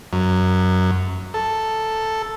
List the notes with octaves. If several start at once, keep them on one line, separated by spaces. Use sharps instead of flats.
F#2
A4